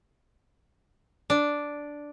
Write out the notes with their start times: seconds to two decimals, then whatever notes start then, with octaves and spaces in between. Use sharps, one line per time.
1.30 D4